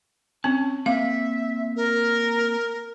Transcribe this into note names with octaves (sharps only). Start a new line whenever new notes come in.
C4 C#4 A5
A#3 C4 E5 F5
A#4